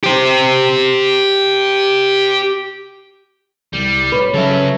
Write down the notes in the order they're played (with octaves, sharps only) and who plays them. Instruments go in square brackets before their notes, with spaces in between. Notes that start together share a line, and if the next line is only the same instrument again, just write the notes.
[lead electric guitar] G4 C5
[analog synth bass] C2 [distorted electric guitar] G3
[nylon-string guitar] B4 C#5
[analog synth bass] C#3 [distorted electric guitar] F#3 C#4 [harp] A4 E5